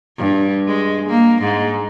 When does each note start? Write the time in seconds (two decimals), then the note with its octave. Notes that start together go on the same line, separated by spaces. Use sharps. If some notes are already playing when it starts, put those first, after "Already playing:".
0.18 G2
0.67 G#3
1.09 A#3
1.42 G#2